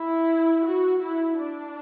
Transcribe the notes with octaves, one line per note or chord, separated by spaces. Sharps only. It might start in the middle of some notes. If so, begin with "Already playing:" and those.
Already playing: E4
F#4
E4
D4